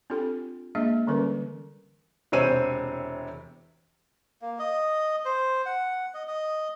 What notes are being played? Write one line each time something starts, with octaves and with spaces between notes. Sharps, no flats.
C4 D4 F4 G4 A4 G5
G#3 A#3 D4 G#4 D#5 E5
D3 E3 G3 C#4 A#4 B4
E1 C3 C5 C#5 E6 D#7
A#3
D#5
C5
F#5
D#5
D#5